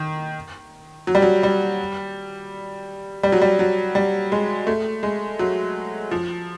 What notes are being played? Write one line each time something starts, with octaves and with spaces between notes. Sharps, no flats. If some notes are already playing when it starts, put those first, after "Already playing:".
Already playing: D#3
F#3
G3
F#3
G3
G3
F#3
G3
F#3
G3
G#3
A3
G#3
F#3
F3